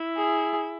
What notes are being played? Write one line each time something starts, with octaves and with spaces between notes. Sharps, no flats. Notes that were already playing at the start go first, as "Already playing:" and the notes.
Already playing: E4
G#4